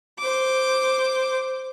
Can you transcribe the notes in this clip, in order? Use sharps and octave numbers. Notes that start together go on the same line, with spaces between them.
C5 D6